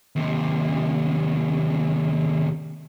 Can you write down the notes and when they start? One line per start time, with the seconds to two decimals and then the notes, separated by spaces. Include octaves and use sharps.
0.16 D#2 C3